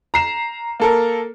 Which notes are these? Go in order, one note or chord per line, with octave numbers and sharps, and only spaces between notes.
A#5 C7 E7
A#3 A4 A#4